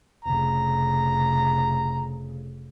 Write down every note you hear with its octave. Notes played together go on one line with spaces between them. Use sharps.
F1 C#3 A#5